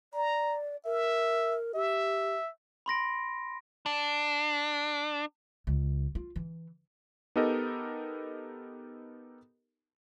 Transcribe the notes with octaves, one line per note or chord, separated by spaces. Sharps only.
D5 A#5
A#4 E5
G4 E5
B5 C6 A#6 D7
D4
C#2
F4
E3
B3 D#4 G4 A4 A#4 D#5